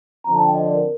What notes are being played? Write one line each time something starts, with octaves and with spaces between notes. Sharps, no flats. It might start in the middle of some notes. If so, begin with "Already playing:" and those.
D3 F3 C4 A#5
A5
G5
D#5
D5
A#4